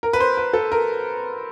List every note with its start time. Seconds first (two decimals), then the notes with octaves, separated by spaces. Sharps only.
0.03 A#4
0.13 B4
0.20 C5
0.37 B4
0.53 A4
0.72 A#4